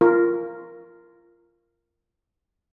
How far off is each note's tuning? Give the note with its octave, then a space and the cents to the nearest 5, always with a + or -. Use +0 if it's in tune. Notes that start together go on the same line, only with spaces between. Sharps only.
F4 -20 A#4 -5